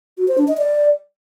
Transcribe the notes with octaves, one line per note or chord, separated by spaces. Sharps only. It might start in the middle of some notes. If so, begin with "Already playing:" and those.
F#4
C5
D4
D#5
D5